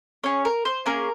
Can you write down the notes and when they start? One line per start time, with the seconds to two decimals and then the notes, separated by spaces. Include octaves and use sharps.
0.24 C#4 G#4 C#5
0.45 A#4
0.65 C5
0.86 A#3 C#4 G#4 A#4